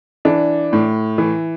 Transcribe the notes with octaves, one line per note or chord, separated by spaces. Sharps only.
E3 D4
A2
E3